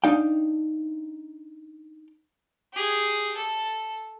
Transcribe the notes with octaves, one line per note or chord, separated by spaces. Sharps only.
D4 D#4 F5 G5
G4 G#4
A4